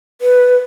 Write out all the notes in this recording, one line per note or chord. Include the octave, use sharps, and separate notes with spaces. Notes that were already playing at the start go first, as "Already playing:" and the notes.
B4